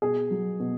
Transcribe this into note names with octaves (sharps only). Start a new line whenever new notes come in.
B2 G#4
F#3
B2